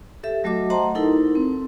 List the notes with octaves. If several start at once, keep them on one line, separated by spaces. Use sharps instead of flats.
G4 A4 E5
F#3 A3 F#4 D#5 D6
C5 D#5 F#5 A5 A#5 C6
D#4 E4 A4 A#4
C4